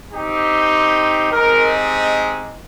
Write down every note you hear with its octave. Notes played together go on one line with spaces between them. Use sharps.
C4 D#4 G4
G#3 C4 D#4 G4 A#4